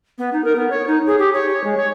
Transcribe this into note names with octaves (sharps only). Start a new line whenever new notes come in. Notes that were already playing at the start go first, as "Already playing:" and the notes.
B3
D#4
A#4
B3
C#5
D#4
G#4
G4
C#5
C#5
G#3
C#5